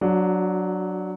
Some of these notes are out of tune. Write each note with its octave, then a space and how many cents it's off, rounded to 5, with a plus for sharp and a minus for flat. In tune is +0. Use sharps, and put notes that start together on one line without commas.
F#3 +0 D4 +0 F#4 -35